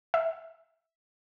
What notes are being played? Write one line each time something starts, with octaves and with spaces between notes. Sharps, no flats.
E5